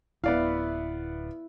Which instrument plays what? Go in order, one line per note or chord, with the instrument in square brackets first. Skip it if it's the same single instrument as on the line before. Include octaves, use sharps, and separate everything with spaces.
[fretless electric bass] D1 [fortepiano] B3 D5 F5 [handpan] E4